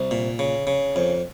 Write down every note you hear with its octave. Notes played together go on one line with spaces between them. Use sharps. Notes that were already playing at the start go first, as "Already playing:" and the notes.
Already playing: C2
A#2
C#3
C#3
F2